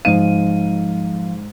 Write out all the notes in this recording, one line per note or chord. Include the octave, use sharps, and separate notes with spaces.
G#2 F3 F5 D#7